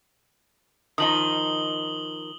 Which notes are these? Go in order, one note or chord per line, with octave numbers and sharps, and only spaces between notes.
D#3 F3 D#4 D#6 F#7 G7